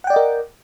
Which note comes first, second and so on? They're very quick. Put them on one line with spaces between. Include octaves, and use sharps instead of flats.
F#5 G5 D5 D#5 A#4